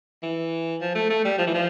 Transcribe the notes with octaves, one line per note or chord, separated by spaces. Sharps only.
E3
F3
A3
A3
G3
F3
E3
F3